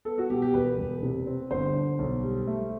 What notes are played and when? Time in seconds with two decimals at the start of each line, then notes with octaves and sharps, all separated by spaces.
0.05 B3 A4
0.18 F#4
0.30 B2 G4
0.42 G4
0.54 E1 B4
0.78 E1
1.03 C3
1.26 C4
1.51 G1 C5
1.75 D3
1.99 B1
2.23 G3
2.47 A3